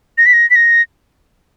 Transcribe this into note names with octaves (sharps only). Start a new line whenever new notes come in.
A#6
B6
A#6
B6
A#6